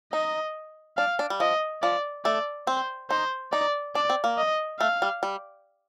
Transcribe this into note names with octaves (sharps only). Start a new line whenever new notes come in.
D#4 D#5
D4 F5
D4
G3
F3 D#5
F3 D5
A3 D5
C4 C5
D#4 C5
D#4 D5
D4 D5
C4
A#3
D#5
A3 F5
G3
G3